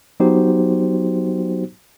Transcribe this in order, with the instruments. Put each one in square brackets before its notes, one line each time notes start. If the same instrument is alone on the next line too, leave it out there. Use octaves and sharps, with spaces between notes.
[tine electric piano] F#3 B3 D#4 F#4 G4 C5